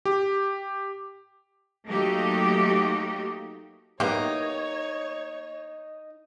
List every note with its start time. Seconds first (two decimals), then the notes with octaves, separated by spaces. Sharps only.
0.05 G4
1.86 F#3 A3 A#3 D#4 F#4 G4
4.00 A#3 B3 D#4 G4 C#5